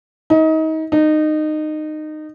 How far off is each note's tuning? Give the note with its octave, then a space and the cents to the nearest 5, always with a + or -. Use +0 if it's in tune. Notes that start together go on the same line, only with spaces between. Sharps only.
D#4 +30
D#4 -20